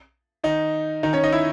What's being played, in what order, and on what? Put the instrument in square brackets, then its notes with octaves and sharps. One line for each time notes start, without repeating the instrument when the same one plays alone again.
[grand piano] D#3 D#4
D#3 D#4
C#4 C#5
D#4 D#5
E4 E5